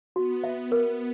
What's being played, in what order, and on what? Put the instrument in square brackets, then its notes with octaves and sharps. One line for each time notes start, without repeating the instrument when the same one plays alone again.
[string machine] B3 [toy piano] F#4
[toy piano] E5
A#4